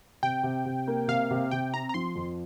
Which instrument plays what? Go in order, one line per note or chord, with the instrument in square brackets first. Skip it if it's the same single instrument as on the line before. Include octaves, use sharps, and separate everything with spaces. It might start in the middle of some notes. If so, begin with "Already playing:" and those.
[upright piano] C3 [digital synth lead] G5
[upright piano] C3
C3
A#3
[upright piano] C3 [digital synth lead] F5
[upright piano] C3
[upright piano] C3 [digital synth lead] G5
[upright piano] C4 [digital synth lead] A#5
[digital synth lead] A#5
[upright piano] F3 [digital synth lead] C6
[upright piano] F2